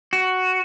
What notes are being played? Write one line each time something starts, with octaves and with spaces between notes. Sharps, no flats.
F#4